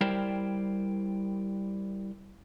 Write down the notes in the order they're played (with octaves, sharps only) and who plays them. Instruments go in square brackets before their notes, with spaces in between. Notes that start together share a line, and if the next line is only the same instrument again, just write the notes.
[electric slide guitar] G3 E4 A#4 C5 D5 G5